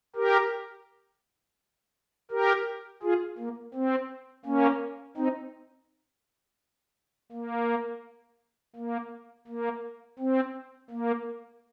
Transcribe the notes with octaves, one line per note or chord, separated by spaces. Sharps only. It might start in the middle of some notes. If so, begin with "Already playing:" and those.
G4 A#4
G4 A#4
F4 G#4
A#3
C4
A#3 C#4
C4 D#4
A#3
A#3
A#3
C4
A#3